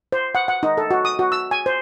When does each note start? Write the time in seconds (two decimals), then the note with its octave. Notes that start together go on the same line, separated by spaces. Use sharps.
0.12 C5
0.35 F#5
0.48 F#5
0.63 D#4
0.77 A4
0.91 F#4
1.05 D#6
1.19 F#4
1.32 E6
1.51 G#5
1.66 C5